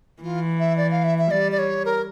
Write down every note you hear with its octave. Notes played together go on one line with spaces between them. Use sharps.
E3 F4
E5
D5
F5
E5
E5
G3 D5
D5
C#5
A#4